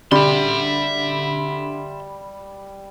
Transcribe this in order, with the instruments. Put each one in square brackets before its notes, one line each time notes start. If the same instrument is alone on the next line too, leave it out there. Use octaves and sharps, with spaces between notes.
[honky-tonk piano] D3 [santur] G3 [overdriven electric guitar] E5 C6